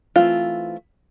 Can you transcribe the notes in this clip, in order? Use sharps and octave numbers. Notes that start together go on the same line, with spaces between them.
E3 A3 C4 F4